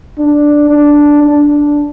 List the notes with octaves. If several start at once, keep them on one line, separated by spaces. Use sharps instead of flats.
D4
D4
D4